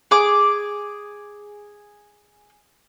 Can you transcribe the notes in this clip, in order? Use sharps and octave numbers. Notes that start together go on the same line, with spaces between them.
G#4 D6